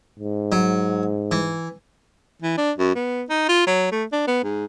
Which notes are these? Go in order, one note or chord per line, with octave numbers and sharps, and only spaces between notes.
G#2
F#3
E3
E3
D4
F#2
B3
D#4
F4
F#3
A3
D4
B3
G#2